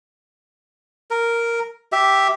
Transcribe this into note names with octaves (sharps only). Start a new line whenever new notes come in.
A#4
G4 E5